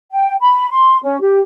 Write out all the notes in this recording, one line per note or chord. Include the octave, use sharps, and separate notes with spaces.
G5
B5
C6
C#4
G4